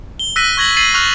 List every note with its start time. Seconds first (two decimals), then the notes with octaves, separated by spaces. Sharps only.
0.19 G7
0.36 E6 F#6 A#6 B6 D#7
0.57 C#6 G#6 A#6 F#7 G7
0.77 A6 C7 D#7 F#7
0.94 C#6 F6 F#6 F7